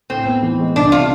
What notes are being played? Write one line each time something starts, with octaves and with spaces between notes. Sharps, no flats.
A2 C4
B3
E3
G#3
C2 D4
C4 F4